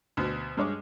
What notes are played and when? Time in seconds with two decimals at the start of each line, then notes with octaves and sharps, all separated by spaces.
0.17 D2 B2
0.57 G2 G#3 C#5 D6